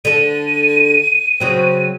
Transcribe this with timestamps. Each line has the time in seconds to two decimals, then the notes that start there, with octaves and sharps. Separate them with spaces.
0.05 D3 A4 D#7
1.40 C#3 F#3 C4